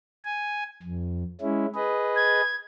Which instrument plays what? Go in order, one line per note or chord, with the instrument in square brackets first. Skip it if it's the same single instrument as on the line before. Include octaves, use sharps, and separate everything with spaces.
[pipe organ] G#5
F2
G#3 C#4 E4
G#4 B4 D#5
[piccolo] G#6